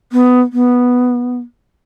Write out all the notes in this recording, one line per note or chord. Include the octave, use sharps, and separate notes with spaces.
B3
B3